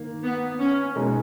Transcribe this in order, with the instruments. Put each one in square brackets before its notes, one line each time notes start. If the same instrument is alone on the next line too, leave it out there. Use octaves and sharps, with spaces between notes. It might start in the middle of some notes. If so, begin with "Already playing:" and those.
Already playing: [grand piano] D#3 A#3
[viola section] B3
C#4
[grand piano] B2 G#3 D#4 A#4